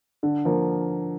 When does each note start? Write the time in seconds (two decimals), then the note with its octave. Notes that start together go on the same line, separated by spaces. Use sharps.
0.23 D3
0.45 F3 A#3